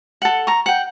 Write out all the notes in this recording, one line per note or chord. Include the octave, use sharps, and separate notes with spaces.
A4 F#5
A#5 C#6
F#5 G5